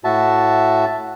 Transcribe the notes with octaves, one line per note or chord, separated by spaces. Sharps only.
A2 F#4 E5 A5